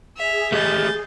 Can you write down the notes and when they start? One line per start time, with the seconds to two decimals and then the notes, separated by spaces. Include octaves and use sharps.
0.17 G#4 E5 F7
0.52 A3 G4 D#5 G6 A6